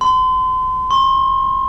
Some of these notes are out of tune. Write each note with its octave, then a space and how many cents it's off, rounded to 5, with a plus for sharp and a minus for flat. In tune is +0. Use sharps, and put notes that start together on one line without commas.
C6 -35
C6 +45